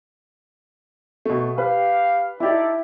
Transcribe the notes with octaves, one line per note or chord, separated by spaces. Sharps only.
B2 A3
G4 B4 F5
D#4 E4 G4 A4 D5